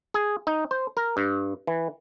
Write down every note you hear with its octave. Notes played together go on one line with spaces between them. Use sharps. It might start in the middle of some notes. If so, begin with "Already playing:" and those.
G#4
D#4
C5
A#4
G2
E3